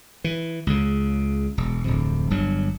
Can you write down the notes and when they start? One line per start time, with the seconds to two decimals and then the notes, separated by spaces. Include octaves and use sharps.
0.24 E3
0.67 C#2 C#3
1.57 E1
1.84 D1 F2 C3
2.30 G1 G2 F#3